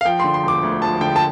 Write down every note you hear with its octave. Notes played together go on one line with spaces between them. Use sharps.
F5
F3 G5
D3 C6
C6
E1
D6
D2
F3 A5
D3 G5
A5